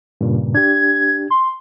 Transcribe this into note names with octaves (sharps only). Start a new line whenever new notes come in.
G2 A#2 C#3
D4 G4 G#6
C6